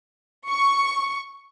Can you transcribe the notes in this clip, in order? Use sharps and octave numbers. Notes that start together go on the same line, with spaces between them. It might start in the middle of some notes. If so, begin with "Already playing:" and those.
C#6